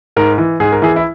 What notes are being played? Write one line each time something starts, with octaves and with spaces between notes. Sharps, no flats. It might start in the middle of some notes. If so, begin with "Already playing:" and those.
G#2 A#4
E3
G#2 G#4
A#4
E3 G#4
E4